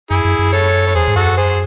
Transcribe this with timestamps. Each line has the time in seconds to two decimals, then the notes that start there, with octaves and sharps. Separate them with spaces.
0.11 F#2 E4 G#4
0.25 F#2
0.39 F#2
0.53 A4 C#5
0.87 C#5
0.95 E2 G#4 C5
1.08 G#2
1.16 F#2 F#4 A4
1.37 G#4 C5